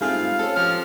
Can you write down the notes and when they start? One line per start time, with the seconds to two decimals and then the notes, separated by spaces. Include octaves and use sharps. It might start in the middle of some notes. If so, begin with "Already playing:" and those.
0.01 G#2 G3 A3 C4 F4 G#4 F5
0.39 C4 C#4 A4
0.56 F3 G4 F6